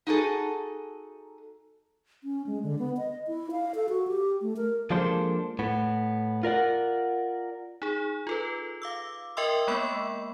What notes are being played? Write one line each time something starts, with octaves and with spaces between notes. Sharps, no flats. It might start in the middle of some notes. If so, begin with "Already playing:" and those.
D#4 F#4 G#4 A4
C#4
G#3
D3
B3
D#5
E4
F5
A4
F#4
G4
A3
A#4
F3 G#3 A#3 D4 A4 C5
A2 B3
F4 A#4 D5 F#5
D#4 G#4
F4 A4 B4
F5 D6 E6
A#4 D#5 E5 G5 C6 E6
G#3 A#3 B3 B5 E6